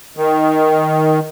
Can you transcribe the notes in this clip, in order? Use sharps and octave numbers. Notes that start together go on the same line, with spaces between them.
D#3